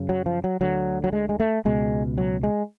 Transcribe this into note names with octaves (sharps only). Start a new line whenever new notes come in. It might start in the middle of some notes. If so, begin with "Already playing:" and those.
Already playing: F#2 C#3
F#3
F3
F#3
D2 D3 F#3
F#3
G#3
G#3
A3
C#2 B2 G#3
F#3
G#3